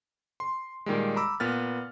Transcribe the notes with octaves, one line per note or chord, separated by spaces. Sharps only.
C6
A#2 D#3 G3 G#3
A#5 B5 D6 E6
A#2 B3 B4 F6 A6